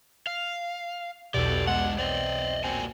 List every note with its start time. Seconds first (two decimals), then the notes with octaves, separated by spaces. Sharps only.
0.27 F5
1.34 B1 E2 B2 G4 A4 D5
1.67 G#3 D4 F#5
1.98 C4 D5 D#5
2.64 A#2 C4 F#4 G#5